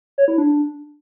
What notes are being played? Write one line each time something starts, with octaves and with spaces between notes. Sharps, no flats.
C#5
E4
D4